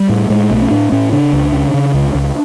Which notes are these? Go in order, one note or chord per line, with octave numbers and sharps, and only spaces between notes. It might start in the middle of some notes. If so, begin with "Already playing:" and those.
Already playing: G3
A2
A2 G#3
B1 A3
C#4
A2 D4
A2 C#4
C#3 D4
C#2
C#3
C#3
C#2
C#2